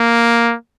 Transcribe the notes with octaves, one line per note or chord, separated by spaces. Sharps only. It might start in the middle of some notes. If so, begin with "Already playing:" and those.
Already playing: A#3